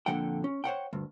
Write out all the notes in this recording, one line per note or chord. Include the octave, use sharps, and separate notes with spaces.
F2 A#2 D3 F3 F#5 G5
C#4
C5 C#5 F#5 G5
D2 G2